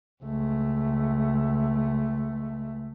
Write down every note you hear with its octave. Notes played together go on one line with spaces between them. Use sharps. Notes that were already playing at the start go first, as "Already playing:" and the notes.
C#2 A3